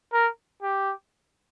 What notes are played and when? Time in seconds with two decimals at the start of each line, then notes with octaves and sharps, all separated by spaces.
0.13 A#4
0.62 G4